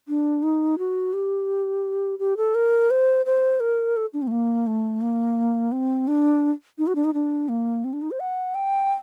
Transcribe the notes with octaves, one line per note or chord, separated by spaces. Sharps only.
D4
D#4
F#4
G4
G4
A4
A#4
C5
C5
A#4
A4
D4
C4
A3
A#3
A3
A#3
C4
D4
D#4
F#4
D4
D#4
D4
A#3
C4
D4
D#4
C5
F#5
G5